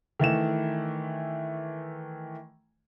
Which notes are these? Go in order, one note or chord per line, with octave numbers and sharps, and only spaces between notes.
D#3 E3 A3 E7